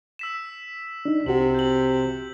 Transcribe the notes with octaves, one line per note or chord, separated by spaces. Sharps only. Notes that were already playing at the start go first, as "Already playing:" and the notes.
E6 B6 E7
D4 D#4
C2 C3 F#4 F#7
G6 F#7